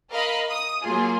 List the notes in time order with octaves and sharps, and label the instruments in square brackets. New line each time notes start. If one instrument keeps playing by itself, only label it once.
[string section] A#4 D#5 F5 B5
D#6
F#3 A#3 F4 G#4